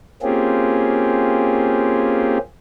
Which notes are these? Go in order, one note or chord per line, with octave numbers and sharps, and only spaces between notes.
A#3 C4 C#4 F4 G4 G#4